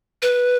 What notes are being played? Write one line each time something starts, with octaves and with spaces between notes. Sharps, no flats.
B4